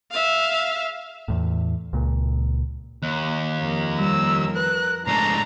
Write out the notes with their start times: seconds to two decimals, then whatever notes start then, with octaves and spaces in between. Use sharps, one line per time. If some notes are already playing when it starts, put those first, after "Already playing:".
0.11 E5 F5
1.28 E2 A2
1.93 C#2 A#2
3.03 D#2 F#6
3.58 F2 A#4
4.00 G3 E6
4.56 B4 F#6
5.07 G#2 A3 D4 A#5 C7